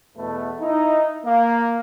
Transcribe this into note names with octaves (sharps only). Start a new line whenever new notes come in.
E2 B2 A3 B4
D#4 E4
A#3